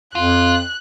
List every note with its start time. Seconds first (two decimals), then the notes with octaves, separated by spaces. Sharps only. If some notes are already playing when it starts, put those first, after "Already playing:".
0.15 F2 F4 F#6